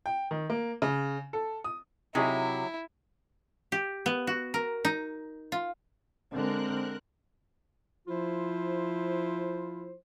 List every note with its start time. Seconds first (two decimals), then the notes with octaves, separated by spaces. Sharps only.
0.06 G5
0.31 D#3
0.50 A#3
0.82 C#3
1.33 A4
1.64 D#6
2.15 C3 F#3 D#4 E4 G#4 C#5
3.72 G4
4.06 B3
4.27 F#4
4.54 A#4
4.85 D#4
5.52 F4
6.31 D3 G#3 C4 A#4 F#6
8.08 F3 E4 F4 C5